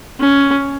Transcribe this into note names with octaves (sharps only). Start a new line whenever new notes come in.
C#4